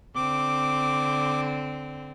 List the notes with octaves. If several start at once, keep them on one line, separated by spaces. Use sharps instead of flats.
D3 C4 D6